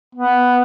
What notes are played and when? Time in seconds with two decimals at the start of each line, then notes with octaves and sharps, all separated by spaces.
0.15 B3